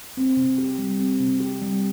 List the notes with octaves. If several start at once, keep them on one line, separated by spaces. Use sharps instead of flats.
C4
C3
G4
G3
C4
C3
G4
G3